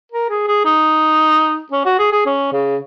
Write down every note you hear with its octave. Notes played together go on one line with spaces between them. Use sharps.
A#4
G#4
G#4
D#4
C#4
F#4
G#4
G#4
C#4
C#3